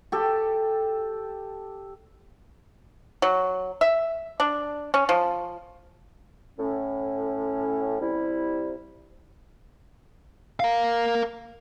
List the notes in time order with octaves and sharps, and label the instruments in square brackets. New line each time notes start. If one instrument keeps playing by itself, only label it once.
[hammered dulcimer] G4 A4
[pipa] F#3
E5
D4
C#4
F3
[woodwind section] A2 C#4
C3 G3 E4
[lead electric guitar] A#4 F5